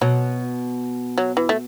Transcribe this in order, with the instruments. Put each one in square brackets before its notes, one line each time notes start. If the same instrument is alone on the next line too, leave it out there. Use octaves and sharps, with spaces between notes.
[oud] B2 [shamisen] F#3
[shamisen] F#3
E3
A3